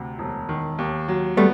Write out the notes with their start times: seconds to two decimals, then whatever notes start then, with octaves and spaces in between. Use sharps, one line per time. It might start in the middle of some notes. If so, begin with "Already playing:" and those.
Already playing: D2 C3
0.19 E1
0.49 D#3
0.79 D#2
1.08 F#3
1.37 G3 A3 B3